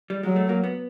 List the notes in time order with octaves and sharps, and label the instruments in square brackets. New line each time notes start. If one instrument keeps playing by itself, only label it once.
[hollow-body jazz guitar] G3
[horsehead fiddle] F#3 [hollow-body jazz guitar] G#3
[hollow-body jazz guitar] A3
A#3
B3